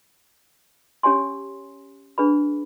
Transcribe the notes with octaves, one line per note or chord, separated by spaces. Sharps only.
C#4 G4 C#5 G#5 C6
D4 G#4 B4 B5